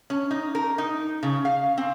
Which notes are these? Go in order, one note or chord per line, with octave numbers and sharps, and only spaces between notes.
C#4
D#4
A#4
D#4
C#3
F5
C4